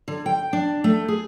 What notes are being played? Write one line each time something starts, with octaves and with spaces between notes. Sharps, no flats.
D3
G5
D4
A3
G#4